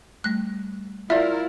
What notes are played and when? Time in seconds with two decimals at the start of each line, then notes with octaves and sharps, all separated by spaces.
0.24 G3 A3 F#6
1.10 E4 F4 A#4 D5 E5